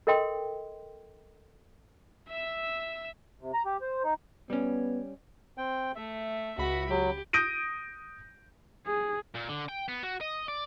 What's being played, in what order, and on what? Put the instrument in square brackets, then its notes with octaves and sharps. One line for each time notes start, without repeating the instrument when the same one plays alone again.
[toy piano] A4 A#4 D#5 G5 C6
[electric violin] E5 E6
[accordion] C3
A#5
G4
C5
D#4
[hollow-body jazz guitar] G3 C#4 [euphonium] B3
[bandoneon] C4 G5
[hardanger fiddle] A3 [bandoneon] E5
[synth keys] C#2 B5 [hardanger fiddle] F#4
[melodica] F#3 [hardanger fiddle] G4
[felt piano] D#6 G6 A#6 D7 D#7
[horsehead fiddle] G#4
[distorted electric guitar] A#2
D3
G5
B3
F#4
D#5
D5